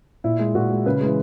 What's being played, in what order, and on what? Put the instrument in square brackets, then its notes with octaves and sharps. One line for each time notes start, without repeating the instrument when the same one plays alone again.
[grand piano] A#2 E4
G#3
A#2 F#4
G#3
C#3 B4
E3 G#3